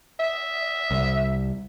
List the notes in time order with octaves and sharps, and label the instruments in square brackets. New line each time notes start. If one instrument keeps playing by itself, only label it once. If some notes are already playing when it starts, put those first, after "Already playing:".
[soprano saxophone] E5
[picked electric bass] C2